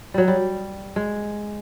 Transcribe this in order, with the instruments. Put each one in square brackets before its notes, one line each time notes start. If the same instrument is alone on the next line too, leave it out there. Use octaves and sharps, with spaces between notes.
[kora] F#3 G3
G3
G#3